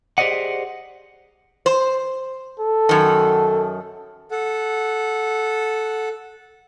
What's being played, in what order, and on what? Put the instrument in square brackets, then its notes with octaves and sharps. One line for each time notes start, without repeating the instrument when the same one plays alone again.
[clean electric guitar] G4 G#4 C5 D5 D#5 F#5
[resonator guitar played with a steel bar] C5
[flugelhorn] A4
[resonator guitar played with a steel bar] F#2 D#3
[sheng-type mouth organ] A4 F#5